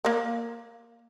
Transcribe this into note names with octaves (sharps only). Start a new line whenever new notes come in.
A#3 A#4